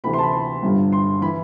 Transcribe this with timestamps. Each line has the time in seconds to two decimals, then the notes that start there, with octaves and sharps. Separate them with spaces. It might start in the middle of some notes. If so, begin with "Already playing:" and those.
0.04 D2 C3 E3 B5
0.13 C6
0.18 A5
0.23 B5
0.33 C6
0.63 G1 G2 D3
0.92 C6
1.21 E3 B5